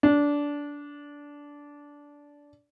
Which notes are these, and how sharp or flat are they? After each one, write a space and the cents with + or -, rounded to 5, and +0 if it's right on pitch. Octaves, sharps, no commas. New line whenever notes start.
D4 -20